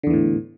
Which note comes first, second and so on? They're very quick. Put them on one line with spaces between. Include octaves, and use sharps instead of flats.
D3 E2 E3 A2